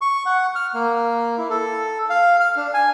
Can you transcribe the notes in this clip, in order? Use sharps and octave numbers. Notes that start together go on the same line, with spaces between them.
C#6
F#5
F6
A#3
E4
A4
F5
F6
D4
G#5